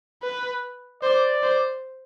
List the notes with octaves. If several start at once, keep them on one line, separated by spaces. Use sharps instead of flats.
B4
C5 D5
C5